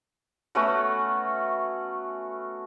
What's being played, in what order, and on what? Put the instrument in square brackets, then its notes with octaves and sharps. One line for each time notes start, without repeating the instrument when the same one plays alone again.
[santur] A3 B3 C#4 F#4